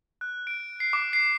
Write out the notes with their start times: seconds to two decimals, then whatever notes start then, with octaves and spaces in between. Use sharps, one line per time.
0.21 F#6
0.47 D7
0.80 C7
0.93 D6
1.13 C7